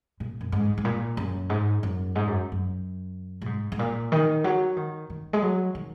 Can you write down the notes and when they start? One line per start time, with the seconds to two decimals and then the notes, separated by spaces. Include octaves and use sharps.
0.20 A#2
0.41 F#2
0.52 G#2
0.78 G#2
0.85 A#2
1.17 F#2
1.50 G#2
1.83 F#2
2.15 G#2
2.27 F#2
2.52 F#2
3.41 A#2
3.46 G#2
3.72 G#2
3.79 A#2
4.12 D#3
4.44 F#3
4.76 D#3
5.10 D#3
5.33 G#3
5.42 F#3
5.75 D#3